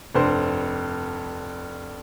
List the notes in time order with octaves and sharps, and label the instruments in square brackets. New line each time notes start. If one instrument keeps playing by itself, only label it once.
[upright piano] F1 G2 C5